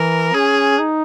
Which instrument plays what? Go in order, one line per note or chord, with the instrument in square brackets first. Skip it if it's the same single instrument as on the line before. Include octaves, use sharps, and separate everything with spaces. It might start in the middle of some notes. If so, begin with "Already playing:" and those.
Already playing: [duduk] E3 [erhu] A#4
[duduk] C#4 [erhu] G#4
[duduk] D#4